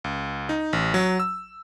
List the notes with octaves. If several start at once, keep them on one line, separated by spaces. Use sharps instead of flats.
C#2
D#4
A1
F#3
E6